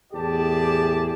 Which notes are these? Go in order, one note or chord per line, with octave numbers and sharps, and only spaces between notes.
E2 A2 G4 G#4 D5 A5